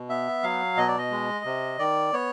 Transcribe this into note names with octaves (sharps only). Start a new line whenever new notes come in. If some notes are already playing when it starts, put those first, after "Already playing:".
Already playing: B2
B3 E5
F#3 F5
B2 D#5
D5
D#5
G#3
C3
D#3 D5
B3 C#5